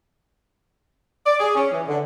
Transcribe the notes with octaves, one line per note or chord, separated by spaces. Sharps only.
D5
G#4
C#4
E3
D3